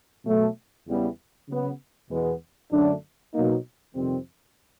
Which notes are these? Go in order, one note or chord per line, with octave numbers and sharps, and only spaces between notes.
B2 F#3 A3
E2 C#3 E3 G3 B3
C#3 F#3 B3
E2 B2 G#3 B3
F#2 D3 F#3 A3 D4
B2 F#3 A#3 D#4
F2 C3 D#3 G3 C4